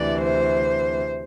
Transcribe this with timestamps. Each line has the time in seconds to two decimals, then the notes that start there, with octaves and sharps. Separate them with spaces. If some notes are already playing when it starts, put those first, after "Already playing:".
Already playing: D2 C3 E3 D5
0.21 C5